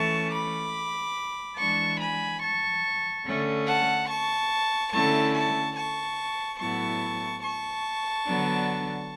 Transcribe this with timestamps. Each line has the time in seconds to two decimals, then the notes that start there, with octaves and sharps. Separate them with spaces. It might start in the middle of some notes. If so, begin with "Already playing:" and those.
Already playing: E3 A3 C#4 A5 C#6
0.33 B5 D6
1.58 E3 G#3 D4 A5 C#6
2.00 G#5 B5
2.41 A5 C#6
3.25 D3 A3 C#4
3.67 F#5 A5
4.08 A5 C#6
4.92 D3 A3 C#4 E4 A5 C#6
5.34 A5 C#6
5.76 A5 C#6
6.58 A2 F#3 B3 E4 A5 C#6
7.43 A5 C#6
8.25 D3 F#3 B3 D4